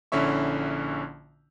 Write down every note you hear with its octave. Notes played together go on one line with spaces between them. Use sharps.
A#1 D3 C#4 E4 E5 C#6